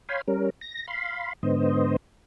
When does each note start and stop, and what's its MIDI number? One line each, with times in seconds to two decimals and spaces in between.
0.09 0.21 73
0.09 0.21 77
0.09 0.21 79
0.09 0.21 80
0.09 0.21 83
0.09 0.21 84
0.28 0.50 55
0.28 0.50 61
0.28 0.50 70
0.61 0.86 94
0.88 1.33 77
0.88 1.33 83
0.88 1.33 84
1.43 1.96 44
1.43 1.96 50
1.43 1.96 59
1.43 1.96 72
1.43 1.96 75